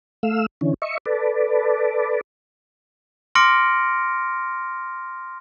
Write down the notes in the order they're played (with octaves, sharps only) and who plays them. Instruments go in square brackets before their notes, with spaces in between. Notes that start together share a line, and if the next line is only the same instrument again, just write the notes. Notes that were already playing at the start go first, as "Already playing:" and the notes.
[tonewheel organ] A3 F5 E6
D3 E3 C#4
D#5 E5 C#6
A4 B4 D5
[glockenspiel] C6 D6 F6 A#6 C#7 D7